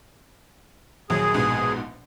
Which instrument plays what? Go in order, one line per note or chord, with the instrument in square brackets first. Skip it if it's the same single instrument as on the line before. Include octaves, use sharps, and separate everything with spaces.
[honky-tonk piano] A#1 D#2 F#3 [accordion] G#4
[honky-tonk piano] A#1 G#2 B2